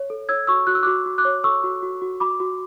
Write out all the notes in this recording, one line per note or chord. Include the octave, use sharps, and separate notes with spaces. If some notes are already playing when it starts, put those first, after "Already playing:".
Already playing: C#5
A4
C#5 E6 G#6
F#4 C#6 E6
F#4 F#6
E6
D6 F#6
F#4
F#4
D6 F#6
C#5
A4 C#6 E6
F#4
F#4
F#4
F#4 B5 D6
F#4